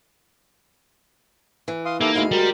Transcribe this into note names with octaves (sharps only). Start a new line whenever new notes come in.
E3
F5 C6 D#6
A#3 D#4 E4 G4 A4
D2 G#3 E4 F5
G3 F#4 A#4